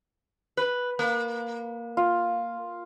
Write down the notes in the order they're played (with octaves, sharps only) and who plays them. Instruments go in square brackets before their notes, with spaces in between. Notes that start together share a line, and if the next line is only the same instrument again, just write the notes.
[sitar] B4
A#3
[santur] F4